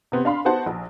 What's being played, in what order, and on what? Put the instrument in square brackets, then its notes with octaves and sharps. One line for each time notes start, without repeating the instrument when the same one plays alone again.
[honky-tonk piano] C3 B3 C4
D4 F5 B5 C6
B3 D#4 F#4 C5 F#5 A5
A#1